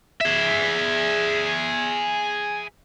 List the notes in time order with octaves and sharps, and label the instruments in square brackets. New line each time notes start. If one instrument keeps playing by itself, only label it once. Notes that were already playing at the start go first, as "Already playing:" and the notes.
[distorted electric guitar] G#4 E5